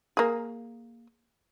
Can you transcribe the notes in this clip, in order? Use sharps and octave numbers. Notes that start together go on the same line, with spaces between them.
A#3 G#4